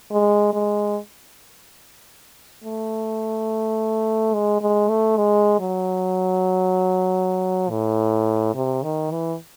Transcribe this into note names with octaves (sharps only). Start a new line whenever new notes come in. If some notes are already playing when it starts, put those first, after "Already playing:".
G#3
G#3
A3
G#3
G#3
A3
G#3
F#3
A2
C3
D#3
E3